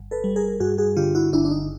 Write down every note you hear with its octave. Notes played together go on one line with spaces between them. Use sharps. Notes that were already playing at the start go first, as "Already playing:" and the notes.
Already playing: G1
A4 B4
G3
G#4 A#4
G2 F#4 G#4
F#4 G#4
D3 F4 G4
E4 F#4
G1 D4 E4
D4
D#4